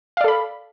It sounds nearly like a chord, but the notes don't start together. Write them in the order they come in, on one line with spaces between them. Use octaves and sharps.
F5 D5 A4 B5